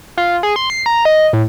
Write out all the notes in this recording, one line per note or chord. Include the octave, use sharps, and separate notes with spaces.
F4
G#4
C6
C7
A#5
D#5
A2